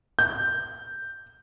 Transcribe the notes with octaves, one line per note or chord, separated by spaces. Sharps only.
G6